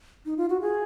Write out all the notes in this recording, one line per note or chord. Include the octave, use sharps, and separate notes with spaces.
D#4
F4
F#4
G#4